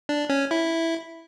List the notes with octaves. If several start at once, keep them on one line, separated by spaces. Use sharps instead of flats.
D4
C#4
E4